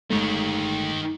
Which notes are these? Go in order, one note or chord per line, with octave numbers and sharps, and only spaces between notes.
G1 D#3 G#3 A3 C#5